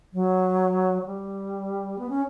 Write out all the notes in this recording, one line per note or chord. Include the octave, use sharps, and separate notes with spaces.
F#3
F#3
G3
B3
C#4